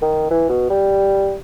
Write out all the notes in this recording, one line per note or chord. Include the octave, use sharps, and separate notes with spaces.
D#3
E3
B2
G3